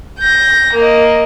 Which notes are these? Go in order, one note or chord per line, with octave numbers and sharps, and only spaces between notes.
G6 A#6
A#3 D#5